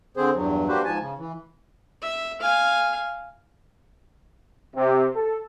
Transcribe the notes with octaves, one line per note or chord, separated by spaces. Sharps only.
D3 C4 G#4 C5
E2 G2 F#3
A#3 D4 F#4 G4 B4 C5
G#2 F3 G#5 A5
C#3
E3
E5
F5 G#5
C3
A4